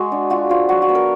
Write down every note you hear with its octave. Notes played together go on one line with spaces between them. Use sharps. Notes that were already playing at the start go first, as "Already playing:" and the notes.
Already playing: G#3 F#4
D4
F4 F#4
F3 F4
F#3 F#4
F#4
B3
A#4